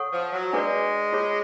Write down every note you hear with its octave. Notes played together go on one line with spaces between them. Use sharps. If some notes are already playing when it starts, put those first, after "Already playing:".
Already playing: A4 C#5 F#5 C#6
F3
F#3
G#3 D4 G#4 B4 D5
F4 G#4 C#5